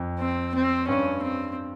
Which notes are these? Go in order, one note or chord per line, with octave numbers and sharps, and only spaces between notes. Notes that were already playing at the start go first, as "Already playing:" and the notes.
Already playing: F2
C4
C4
G2 C#4
C4